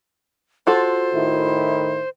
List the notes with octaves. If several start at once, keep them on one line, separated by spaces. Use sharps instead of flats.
F4 F#4 A4 C5
A2 D#3 E4